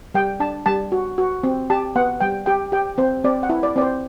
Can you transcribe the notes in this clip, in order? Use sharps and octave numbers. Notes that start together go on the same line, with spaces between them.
G3 G5
D4 A5
G3 A5
F#4
F#4
C4
G4 A5
B3 F#5
G3 G5
G4 G5
G4 G5
C4 C5
C4 D5
F#5
E4
D5
C4 D5
C5